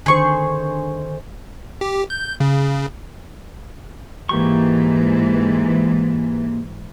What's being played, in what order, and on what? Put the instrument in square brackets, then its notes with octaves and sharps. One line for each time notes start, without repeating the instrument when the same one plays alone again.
[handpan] D3 D#3 C5 [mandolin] G#4 C#6
[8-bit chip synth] G4
G6
C#3
[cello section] G#2 E3 [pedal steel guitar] A#3 G4 C#6